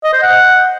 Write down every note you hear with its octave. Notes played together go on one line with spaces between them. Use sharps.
D#5
C5
F#5